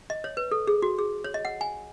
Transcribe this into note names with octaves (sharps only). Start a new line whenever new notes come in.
D#5
C#5
B4
A4
G#4
F#4
G#4
C#5
D#5
F#5
G#5